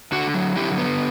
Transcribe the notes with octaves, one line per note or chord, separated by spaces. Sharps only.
D3 F#4
F#3
D3 E4 G4
B3